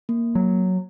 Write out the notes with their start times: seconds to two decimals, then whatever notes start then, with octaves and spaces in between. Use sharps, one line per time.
0.09 A#3
0.35 F#3